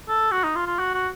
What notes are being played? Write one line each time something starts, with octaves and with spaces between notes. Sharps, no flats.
A4
F#4
D#4
F4
F4
F#4
F#4